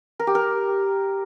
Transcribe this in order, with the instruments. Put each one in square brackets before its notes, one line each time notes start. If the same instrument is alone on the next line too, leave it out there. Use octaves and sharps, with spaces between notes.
[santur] A#4
G4
A#4